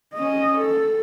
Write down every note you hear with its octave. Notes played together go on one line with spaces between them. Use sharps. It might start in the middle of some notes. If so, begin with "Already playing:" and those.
C#4 D#5
A4